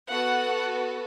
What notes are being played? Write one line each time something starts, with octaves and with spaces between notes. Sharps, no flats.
B3 F#4 A4 F#5